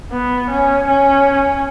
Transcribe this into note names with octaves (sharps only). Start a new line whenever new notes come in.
B3
C#4
C#4